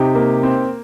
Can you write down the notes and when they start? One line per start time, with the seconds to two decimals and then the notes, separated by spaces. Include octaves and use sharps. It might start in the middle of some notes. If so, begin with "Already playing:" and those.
Already playing: C3 D#4 G4
0.15 A#3
0.43 C4